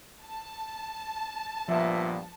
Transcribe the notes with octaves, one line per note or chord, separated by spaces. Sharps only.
A5
G2 A#2 F3 B3 E5